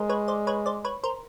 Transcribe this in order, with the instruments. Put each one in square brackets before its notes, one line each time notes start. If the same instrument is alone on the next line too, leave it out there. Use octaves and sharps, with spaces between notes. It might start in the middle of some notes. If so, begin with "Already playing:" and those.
Already playing: [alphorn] G#3 [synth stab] A#4 C5
[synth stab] B4 C#5
C5 D5
B4 C#5
C5 D5
B4 C#5
A#4 C5